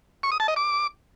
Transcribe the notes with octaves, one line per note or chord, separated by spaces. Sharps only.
C#6
D#6
A5
D#5
D6